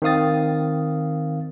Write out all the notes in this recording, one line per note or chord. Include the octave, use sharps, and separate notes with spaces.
D#3 C4 F5 D#6 A6